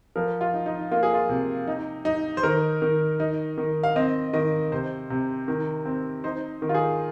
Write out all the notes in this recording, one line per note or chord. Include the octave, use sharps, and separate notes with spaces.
F3 A#4
F4
D#4
D#4
A#3 F4
G#4
F4
C3
D#4
D#4
C5
D#3 A#4
D#3
D#4
D#3
F5
C4 D#5
D#3 D#5
C3 C5
C3
D#3
C4
D#4 C5
D#3
F4
G#4